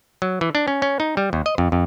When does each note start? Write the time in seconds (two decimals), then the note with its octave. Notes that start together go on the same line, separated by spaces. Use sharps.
0.22 F#3
0.41 E3
0.55 D4
0.68 C#4
0.82 C#4
1.00 D#4
1.17 G3
1.33 D#2
1.46 D#5
1.58 F2
1.72 F2